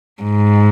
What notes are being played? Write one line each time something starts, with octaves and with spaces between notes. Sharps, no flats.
G#2